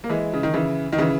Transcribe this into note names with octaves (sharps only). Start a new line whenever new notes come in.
A#3
E3 G#3
C#3
D#3
C#3 E3
D#3
C#3 E3